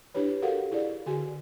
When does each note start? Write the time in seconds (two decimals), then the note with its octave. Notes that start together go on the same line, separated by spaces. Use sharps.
0.15 D4 E4 G4 B4 C#5
0.42 F#4 G4 A4 A#4 F5 F#5
0.71 E4 G#4 D5
1.06 D3 F#4 G#4 G#5